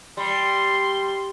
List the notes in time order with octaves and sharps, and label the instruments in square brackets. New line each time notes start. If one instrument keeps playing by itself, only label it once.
[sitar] G3 [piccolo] C6